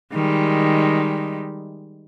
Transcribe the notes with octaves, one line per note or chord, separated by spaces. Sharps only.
D#3 G3 G#3